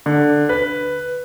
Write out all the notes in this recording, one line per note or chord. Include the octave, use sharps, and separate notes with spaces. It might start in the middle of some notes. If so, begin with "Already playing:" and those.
D3
B4